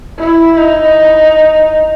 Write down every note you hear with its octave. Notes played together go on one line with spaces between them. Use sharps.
E4
D#4